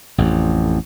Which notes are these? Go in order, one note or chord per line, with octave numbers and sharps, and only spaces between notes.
A1 F2